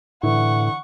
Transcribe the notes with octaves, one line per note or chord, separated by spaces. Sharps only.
A2 D3 E3 E4 F#5 C#6